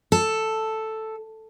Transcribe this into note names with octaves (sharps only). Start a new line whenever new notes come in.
A4